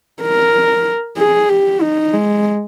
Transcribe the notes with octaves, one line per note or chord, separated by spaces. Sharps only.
A#4
G#4
G4
D#4
G#3